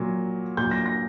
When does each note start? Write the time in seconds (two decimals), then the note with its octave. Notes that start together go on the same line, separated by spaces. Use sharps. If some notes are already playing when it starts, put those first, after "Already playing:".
Already playing: A#2 F#3
0.57 A#2 F#3 G6
0.71 A#6
0.86 A#6